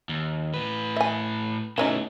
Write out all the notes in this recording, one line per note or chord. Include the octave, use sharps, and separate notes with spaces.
D#2
A2 B4
E5 G#5
B2 E3 A3 C#4 D#4